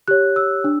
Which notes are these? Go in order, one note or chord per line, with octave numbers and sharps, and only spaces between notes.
G4 C#5 F#6
E6
D4